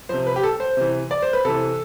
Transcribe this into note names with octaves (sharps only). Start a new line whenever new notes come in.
C3 F3 C5
B4
G4
A4
C5
C3 E3
D5
C5
B4
C3 E3 A4